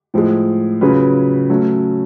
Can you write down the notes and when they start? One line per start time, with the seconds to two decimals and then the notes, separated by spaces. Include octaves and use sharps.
0.14 A2 F3 G#3
0.81 C#3 F#3 C#4 F4 B4
1.49 F#3 A3 C#4